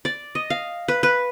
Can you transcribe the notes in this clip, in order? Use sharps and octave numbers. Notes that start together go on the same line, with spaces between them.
D5
D#5
F5
B4
B4